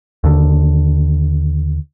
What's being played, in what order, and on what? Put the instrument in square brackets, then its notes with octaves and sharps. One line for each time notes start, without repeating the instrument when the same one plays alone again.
[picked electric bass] D#2 D3